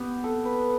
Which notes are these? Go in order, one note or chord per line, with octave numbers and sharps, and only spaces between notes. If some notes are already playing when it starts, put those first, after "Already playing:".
Already playing: B3 G4
A4
B4